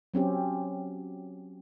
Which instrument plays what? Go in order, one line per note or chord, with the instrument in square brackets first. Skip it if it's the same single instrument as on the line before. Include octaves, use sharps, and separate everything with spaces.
[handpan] F#3 C4 C#4 G4